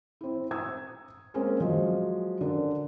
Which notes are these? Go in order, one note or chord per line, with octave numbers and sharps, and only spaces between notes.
C4 E4
A#5 D#6 E6 G#6
G#3 A#3 C4 C#4 G#4 A#4
F3 F#3 G#3 D#5
D3 C#4 D4 A#4